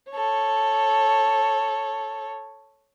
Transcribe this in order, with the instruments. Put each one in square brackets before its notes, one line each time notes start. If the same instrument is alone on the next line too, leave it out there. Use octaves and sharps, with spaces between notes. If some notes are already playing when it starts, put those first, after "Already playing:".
[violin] A4 C#5